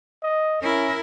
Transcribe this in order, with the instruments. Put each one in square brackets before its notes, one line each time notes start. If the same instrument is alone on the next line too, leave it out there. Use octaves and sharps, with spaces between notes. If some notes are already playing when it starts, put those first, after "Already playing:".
[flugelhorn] D#5
[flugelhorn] C#4 [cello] E4 A#4